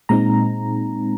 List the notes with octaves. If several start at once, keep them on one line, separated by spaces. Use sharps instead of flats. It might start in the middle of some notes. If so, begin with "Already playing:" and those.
A#2 G#3 C4 D#4 A#5